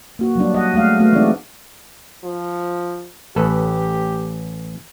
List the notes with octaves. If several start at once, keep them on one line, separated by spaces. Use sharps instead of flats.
A#3 F#4
F#3 G3 D4
D#5 F#5
G#3 A3 D4 F5
A3 B3 F#4
E3 G#3 B3 C4 D#4 D5
F3
A1 G4 A4 B4